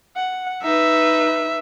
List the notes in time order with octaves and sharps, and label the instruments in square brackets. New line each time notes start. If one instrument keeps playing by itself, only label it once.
[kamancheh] F#5
[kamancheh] D#4 B4 [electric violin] E5